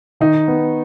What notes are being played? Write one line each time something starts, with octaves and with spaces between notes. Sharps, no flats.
D#3 D#4
B3